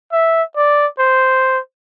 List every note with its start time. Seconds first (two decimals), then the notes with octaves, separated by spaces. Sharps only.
0.13 E5
0.57 D5
0.99 C5